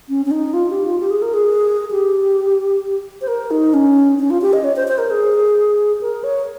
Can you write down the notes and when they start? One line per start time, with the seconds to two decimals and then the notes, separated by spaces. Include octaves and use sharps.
0.09 C#4
0.26 C#4
0.31 D#4
0.54 F4
0.70 G4
0.85 F4
1.00 G4
1.11 G#4
1.22 A#4
1.34 G#4
1.91 G4
3.21 C5
3.28 A#4
3.51 D#4
3.74 C#4
4.19 C#4
4.30 F4
4.42 G4
4.53 D#5
4.64 C#5
4.76 C5
4.88 C5
4.98 A#4
5.10 G#4
6.01 A#4
6.24 C#5